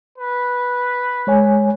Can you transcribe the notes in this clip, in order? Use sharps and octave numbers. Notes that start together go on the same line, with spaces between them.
B4
G#3 C#5 G#5